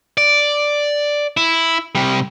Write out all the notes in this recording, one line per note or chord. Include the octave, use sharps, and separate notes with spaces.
D5
E4
C3 G3